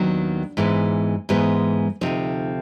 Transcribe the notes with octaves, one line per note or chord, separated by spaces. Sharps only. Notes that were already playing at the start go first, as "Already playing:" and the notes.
Already playing: D#2 D#3 F#3 B3 D4
G#2 E3 G#3 B3
G#2 E3 G#3 B3
D2 C3 F3 D#4